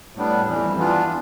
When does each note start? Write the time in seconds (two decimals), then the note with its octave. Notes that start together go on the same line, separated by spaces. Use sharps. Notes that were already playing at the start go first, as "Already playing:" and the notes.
0.15 A2 G3 B3 D4
0.47 F2 E3 G3
0.78 E3 B3 D4 F4